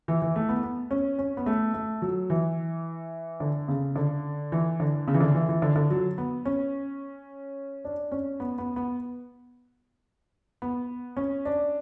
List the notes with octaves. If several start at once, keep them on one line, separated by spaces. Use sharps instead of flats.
E3
E3
A3
B3
B3
C#4
C#4
B3
A3
A3
F#3
E3
D3
C#3
D3
E3
D3
C#3
E3
D3
E3
E3
D3
D3
F#3
B3
C#4
D4
C#4
B3
B3
B3
B3
C#4
D4